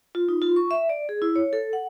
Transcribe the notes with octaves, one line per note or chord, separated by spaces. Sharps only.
F4
D#4
F4
C#6
E5
D5
G#4
E4
C#5
A4
F#5